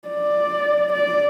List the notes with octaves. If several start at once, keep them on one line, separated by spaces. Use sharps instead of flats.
D5
D5